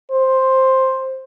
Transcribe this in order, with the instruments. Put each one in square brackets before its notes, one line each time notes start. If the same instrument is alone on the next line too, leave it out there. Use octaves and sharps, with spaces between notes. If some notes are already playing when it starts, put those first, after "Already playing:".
[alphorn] C5